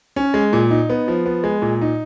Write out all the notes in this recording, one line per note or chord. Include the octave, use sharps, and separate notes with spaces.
C#4
G#3
A#2
D#4
B3
F3
B3
G#3
A#2
D#4